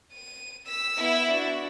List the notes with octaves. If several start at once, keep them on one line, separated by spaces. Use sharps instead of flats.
D#7
E6 B6
B3 E4
D4 F#4